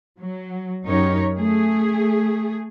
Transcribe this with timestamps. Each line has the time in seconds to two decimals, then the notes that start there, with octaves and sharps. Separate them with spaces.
0.20 F#3
0.87 F#2 D#4 G4 A#4 C#5
1.38 A3 G#4